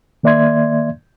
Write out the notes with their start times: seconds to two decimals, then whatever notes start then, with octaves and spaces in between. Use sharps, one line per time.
0.23 D#3 A#3 D5 E5 C6 G#6